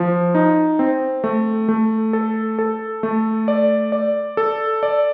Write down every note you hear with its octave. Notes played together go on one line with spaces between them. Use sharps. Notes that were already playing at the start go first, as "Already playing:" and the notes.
Already playing: F3
D#4
C4
A3
A3
A4
A4
A3
D5
D5
A4
D5